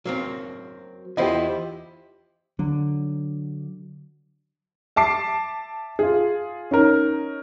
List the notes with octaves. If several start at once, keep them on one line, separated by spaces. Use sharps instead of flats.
F#3 A#3 C4
E2 E4 F4 G4 C5 D#5
D3 F#3
E5 A5 D6 C7
F4 G#4
C#4 D#4 A#4